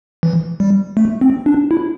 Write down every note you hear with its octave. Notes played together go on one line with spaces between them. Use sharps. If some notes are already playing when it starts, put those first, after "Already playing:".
E3
G3
A3
C4
D4
E4